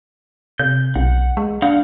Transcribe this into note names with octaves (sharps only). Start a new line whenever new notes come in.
C3 G6
B1 F#5
G#3
D4 F5 F#5